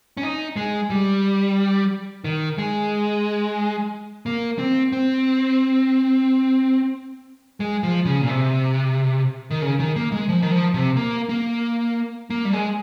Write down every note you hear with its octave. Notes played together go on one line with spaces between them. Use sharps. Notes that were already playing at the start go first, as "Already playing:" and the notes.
C#4
D#4
G#3
G3
D#3
G#3
A#3
C4
C4
G#3
F3
C#3
A#2
C3
D#3
C#3
D#3
A#3
G#3
F3
D#3
F3
C3
A#3
A#3
A#3
G3
G#3